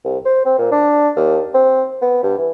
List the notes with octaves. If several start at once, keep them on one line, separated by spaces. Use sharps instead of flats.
C2
C5
C4
A#2
D4
D#2
C4
B3
G2
E3